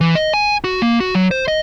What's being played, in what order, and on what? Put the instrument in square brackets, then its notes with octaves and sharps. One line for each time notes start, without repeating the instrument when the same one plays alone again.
[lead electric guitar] E3
D#5
G#5
F#4
A#3
F#4
F#3
C5
D#5